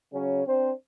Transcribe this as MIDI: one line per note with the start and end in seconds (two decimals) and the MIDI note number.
0.12 0.42 49
0.12 0.42 54
0.12 0.42 61
0.47 0.71 60
0.47 0.71 62
0.47 0.71 72